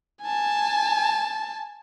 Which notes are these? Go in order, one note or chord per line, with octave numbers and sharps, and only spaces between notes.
G#5 A5